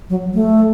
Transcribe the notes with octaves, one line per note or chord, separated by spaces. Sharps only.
F#3
A3